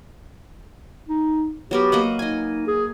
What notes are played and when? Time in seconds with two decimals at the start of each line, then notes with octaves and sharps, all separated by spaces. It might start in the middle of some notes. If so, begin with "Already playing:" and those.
1.08 D#4
1.71 F#3 B3 G4 A#4
1.92 A#3 D#5 F#5
2.19 D#4 D#5 G#5
2.67 G#4